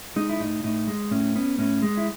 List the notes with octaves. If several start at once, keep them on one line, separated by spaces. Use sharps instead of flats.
G#3 D#4
E4
A2 D#4
A2 D#4
G#3
A2 C#4
B3 C#4
A2 C#4
G#3
E4